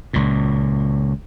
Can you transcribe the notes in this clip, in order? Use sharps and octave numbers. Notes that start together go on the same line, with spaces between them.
C#2 A#2